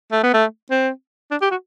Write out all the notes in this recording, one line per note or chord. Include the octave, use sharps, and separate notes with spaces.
A3
B3
A3
C4
D4
G4
F#4